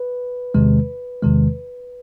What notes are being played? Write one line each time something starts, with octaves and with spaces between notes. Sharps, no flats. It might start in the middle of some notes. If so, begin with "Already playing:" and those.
Already playing: B4
E2 C3 D#3 G#3
E2 C3 D#3 G#3